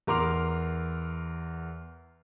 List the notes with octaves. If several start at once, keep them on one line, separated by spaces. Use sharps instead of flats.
E2 A#4 C6 D6 F7